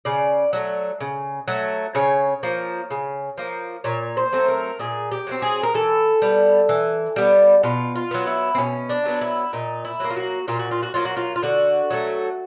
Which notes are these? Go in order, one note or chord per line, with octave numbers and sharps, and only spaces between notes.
C#3 D5
F#3 A3
C#3
F#3 A3
C#3 C#5
F3 A#3
C#3
F3 A#3
A#2 C#5
C5
F#3 A3 C4
A#4
A#2 G#4
G4
F#3 A3 C4
G#4
A#4
E3 A4
G3 B3
E3
G3 B3
B2 F4
F4
F#3 B3
E4
C4
B2 C#4
D4
F#3 B3
E4
A#2 D#4
E4
F#3 A#3
F4
F#4
A#2 F4
F#4
F4
F#4
F#3 A#3 F4
F#4
F4
F4
D3 F#4
F#3 A3